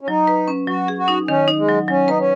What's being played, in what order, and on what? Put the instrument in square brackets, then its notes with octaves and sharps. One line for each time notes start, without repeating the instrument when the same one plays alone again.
[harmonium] C#4
[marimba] F#3 [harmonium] D#4
[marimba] B4
C#4
[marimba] F#3 [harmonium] F#4
[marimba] G#4
[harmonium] F#4
[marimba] D#4
[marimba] D#3 [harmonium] C#4
[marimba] D#4
[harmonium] G#3
[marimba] F#3
[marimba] F#3 [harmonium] C#4
[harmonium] D#4 [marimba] B4
[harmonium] C#4